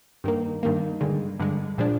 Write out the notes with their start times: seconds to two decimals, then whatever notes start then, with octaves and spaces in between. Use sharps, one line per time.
0.24 G2 D#3 A#3
0.63 G2 D#3 A#3
1.01 G2 D3 G#3
1.39 G2 D3 G#3
1.78 A#2 F3 G#3 D4